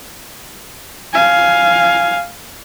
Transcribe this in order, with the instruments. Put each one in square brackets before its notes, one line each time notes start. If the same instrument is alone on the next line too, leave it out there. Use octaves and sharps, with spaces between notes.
[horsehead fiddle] F5 G#5